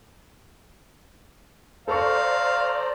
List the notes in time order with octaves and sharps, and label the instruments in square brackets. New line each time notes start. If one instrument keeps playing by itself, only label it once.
[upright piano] A4 C#6 [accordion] C5 D5 A#5 [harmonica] F5